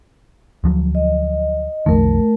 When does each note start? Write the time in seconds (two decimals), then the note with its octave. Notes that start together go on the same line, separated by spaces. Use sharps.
0.64 D2 F3 F#3
0.95 D#5
1.86 B1 F2 D#3 A3 A#4